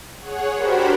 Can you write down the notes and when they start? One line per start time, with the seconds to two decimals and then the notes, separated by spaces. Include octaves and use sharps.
0.19 G#4 C#5 F#5
0.53 D4 F#4 G4 A#4 C5 B5